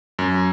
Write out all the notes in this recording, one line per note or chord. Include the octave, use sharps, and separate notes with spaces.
F#2